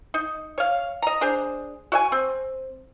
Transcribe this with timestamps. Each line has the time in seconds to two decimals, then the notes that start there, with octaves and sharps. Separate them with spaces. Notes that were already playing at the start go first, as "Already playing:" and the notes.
0.14 D#4
0.58 C#5 F5
1.02 D#5 A#5
1.21 D4 G#4 C5
1.92 F#4 E5 G#5
2.12 C4